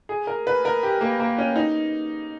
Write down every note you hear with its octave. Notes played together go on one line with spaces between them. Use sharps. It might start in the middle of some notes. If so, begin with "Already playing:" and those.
G#4
A#4
B4
A#4
G4
A#3
A#3
C#4
D#4